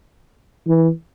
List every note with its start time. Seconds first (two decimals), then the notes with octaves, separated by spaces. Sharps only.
0.67 E3